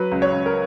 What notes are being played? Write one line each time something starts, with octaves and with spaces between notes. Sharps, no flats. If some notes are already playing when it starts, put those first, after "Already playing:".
Already playing: F#3 B4
C#2
C#5
C#2
A#4